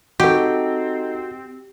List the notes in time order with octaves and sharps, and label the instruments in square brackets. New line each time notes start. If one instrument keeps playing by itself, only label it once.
[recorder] C4 [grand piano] D#4 A4 [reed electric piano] F#4 [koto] G4